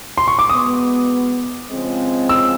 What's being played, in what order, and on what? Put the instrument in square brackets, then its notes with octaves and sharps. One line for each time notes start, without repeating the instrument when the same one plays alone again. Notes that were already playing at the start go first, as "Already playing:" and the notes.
[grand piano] C6
C#6
D6
[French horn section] B2 G#3 B3 [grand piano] D#6
[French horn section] C#3 F3 G#3 C4
[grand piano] E6